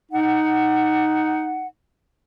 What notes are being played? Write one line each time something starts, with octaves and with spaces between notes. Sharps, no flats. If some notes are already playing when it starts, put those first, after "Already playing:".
D#4 F#5